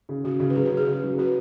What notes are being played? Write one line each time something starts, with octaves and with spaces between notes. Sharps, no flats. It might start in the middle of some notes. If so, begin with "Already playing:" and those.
C#3
C#3 F#4
C#3 F#4
B4
F#3 G#4
B4
C#3
G#4
C#3
F#3
F#4 B4